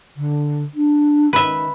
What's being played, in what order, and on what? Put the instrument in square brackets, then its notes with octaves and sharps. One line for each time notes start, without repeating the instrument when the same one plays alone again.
[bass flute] D3
D4
[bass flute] D#3 [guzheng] B4 E5